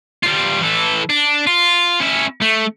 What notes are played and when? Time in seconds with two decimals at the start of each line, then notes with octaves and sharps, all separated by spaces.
0.23 G3 F4
0.61 E3 A4
1.09 D4
1.47 F4
2.00 C#4 E4
2.42 A3